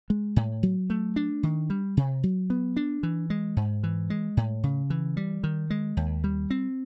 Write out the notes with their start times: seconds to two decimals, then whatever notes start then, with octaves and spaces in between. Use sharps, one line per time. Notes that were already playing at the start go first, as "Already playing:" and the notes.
0.10 G#3
0.36 A2
0.63 F#3
0.90 A3
1.16 D4
1.43 D#3
1.70 G3
1.97 C3
2.23 F#3
2.50 B3
2.76 D4
3.03 E3
3.30 G#3
3.57 G#2
3.84 E3
4.10 G#3
4.37 A2
4.63 C#3
4.90 E3
5.17 G3
5.44 D#3
5.70 G#3
5.97 D#2
6.24 G3
6.50 C4